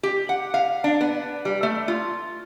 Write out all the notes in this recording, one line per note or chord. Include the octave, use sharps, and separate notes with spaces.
G4
F#5
F5
D4
B3
G3
A3
F4